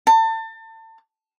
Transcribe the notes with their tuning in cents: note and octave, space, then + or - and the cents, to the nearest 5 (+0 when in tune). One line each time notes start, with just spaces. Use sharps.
A5 +30